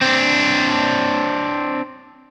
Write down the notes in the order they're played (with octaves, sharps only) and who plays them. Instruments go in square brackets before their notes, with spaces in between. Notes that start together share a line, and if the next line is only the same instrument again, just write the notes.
[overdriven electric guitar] C4 D4